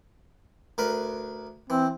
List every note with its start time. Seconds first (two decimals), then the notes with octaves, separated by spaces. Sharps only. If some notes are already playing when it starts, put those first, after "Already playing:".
0.78 D2 A#4 B4
1.70 E3 C4